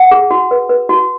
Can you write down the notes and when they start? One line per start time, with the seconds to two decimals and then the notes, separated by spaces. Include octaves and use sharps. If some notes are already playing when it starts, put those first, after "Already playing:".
Already playing: F#5
0.11 G#4
0.31 F#4
0.51 B4
0.69 B4
0.89 F#4